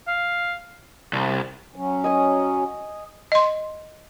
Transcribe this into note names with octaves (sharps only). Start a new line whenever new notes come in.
F5
C2
F#3 C#4
D#5 G#5 D#6
D#5 C6